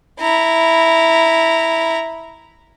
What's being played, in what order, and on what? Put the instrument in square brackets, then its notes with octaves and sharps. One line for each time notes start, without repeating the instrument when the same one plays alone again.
[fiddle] E4 A#5